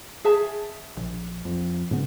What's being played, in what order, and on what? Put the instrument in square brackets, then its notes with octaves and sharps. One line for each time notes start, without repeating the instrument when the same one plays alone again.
[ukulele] G#4 E5 A5
[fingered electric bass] A#1
F2
G#2 C#3 B3